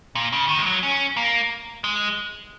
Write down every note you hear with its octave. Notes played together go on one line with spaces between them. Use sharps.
A#2
C#3
D#3
G#3
F#3
C#4
A#3
G#3